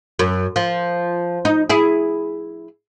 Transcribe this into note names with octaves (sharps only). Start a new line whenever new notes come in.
F#2
F3
D#4
E4 G#4